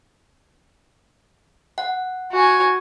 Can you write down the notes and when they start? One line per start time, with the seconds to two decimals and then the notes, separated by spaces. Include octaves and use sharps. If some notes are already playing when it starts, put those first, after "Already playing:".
1.78 F#5
2.32 F#4 G#5